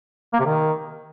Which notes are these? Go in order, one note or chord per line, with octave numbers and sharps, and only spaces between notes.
A#3
C3
D#3